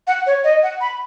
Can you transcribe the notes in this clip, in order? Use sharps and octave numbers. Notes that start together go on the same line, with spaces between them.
F#5
C#5
D#5
F#5
B5